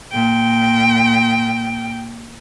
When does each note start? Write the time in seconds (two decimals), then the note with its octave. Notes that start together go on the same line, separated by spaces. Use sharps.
0.12 A#2 G5